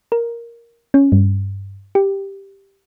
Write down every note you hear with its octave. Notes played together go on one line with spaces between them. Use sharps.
A#4
C#4
G2
G4